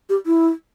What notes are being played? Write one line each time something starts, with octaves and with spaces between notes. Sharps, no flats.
G4
E4